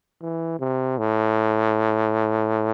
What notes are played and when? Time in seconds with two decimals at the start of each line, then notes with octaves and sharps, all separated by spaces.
0.22 E3
0.60 C3
0.98 A2